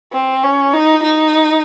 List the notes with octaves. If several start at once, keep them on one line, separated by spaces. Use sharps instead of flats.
C4
C#4
D#4
D#4